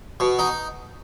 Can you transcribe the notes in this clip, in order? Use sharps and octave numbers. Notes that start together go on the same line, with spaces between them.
B2
D#4